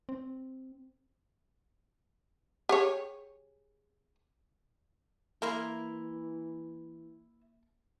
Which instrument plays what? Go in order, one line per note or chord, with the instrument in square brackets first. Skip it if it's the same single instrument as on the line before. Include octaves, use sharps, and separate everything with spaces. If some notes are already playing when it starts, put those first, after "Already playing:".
[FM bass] C4
[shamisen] G4 G#4 C#5
[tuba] E3 [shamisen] A#3 [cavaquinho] E4 A#5 C6